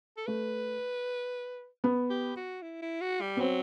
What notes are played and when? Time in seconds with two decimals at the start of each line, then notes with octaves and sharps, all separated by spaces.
0.17 A4
0.27 A3 B4
1.84 B3
2.10 G4
2.36 F#4
2.62 E4
2.82 E4
3.01 F#4
3.21 G3
3.37 B3
3.40 F#3 C4